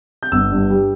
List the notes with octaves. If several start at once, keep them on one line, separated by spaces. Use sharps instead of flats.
G6
G1 E6
G2
G3